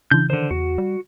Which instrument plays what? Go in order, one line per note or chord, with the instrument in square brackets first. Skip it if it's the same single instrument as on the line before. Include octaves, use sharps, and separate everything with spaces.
[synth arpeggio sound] C#3 E3 [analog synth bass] D4 [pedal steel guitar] G6
[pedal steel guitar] D3 C5 [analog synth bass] D#3
[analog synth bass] E2 [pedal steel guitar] F#4
[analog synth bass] G3